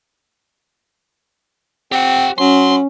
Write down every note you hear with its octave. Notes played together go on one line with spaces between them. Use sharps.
C4 G4 F#5
F#3 C#4 C6